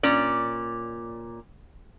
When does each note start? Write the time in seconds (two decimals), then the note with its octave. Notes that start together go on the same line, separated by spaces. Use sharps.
0.03 A#2 C#4 D5